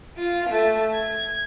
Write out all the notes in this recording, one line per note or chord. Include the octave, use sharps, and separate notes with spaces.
F4
A3
G#6